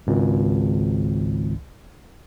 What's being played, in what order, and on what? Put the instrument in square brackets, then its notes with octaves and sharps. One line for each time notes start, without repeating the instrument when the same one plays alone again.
[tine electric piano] G#1 C#2